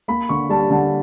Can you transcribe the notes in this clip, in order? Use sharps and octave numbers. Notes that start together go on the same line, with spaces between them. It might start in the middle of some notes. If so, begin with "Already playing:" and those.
A#3 B5
D3 C#6
G3 A5
D3 A5